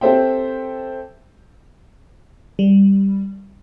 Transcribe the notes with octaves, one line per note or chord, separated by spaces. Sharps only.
C4 G4 A4 C5 E5 G5
G3